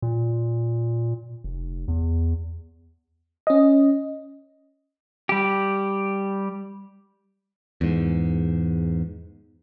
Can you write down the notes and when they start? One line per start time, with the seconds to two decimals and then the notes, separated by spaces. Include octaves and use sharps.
0.02 A#2
1.44 F1
1.88 E2
3.47 C#4 D#5
5.29 G3 G4
7.81 E2 G#2